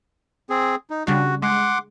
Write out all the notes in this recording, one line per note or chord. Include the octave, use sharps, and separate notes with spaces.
C4 G#4
D#4
C#3 G3 D4 F#4
G#3 F#5 C6 D6